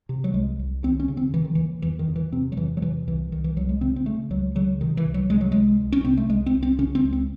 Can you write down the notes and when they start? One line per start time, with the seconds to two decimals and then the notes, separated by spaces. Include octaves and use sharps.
0.09 C3
0.24 F#3
0.33 C2 G#3
0.59 C2
0.83 D#2 C4
1.00 C#4
1.08 C#3
1.17 C4
1.34 C#3 E3
1.44 D#3
1.55 D#2 E3
1.82 E2 E3
1.99 D#3
2.08 E2
2.16 E3
2.32 C3 C4
2.52 F#3
2.57 E2 E3
2.77 F#3
2.82 C3 E3
3.07 C2 E3
3.32 C2 D#3
3.44 E3
3.56 C2 F#3
3.69 G#3
3.81 C#3 C4
3.96 C4
4.06 C#3 A3
4.30 C#2 F#3
4.55 C#3 F#3
4.81 C3 D#3
4.97 E3
5.06 C2
5.14 F#3
5.30 C3 G#3
5.41 F#3
5.52 C2 G#3
5.80 C2
5.92 C#4
6.04 C3 C4
6.17 A3
6.29 C2 G#3
6.46 C4
6.54 C2
6.63 C4
6.78 C#3 C#4
6.95 C4
7.04 C#2
7.13 C4